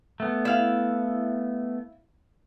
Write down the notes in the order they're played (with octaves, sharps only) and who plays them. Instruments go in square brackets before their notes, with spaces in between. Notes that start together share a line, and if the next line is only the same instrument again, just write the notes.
[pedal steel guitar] A3 B3
[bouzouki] E4 F5